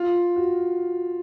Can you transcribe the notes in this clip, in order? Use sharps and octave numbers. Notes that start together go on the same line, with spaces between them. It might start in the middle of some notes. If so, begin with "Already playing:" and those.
Already playing: F4
F#4